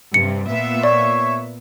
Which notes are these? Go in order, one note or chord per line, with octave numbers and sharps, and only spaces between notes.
G2 C3 C#7
A#2 B3 E5
C#5 D5